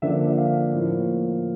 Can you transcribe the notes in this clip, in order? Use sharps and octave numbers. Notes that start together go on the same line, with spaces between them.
D3 F3 A#3 D4 E5
E5
F5
A2 F3 A#3